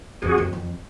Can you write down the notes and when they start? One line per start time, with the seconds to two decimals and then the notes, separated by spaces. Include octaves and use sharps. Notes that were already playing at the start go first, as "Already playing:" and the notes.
0.22 F2 F#4 G#4
0.38 F2
0.53 F2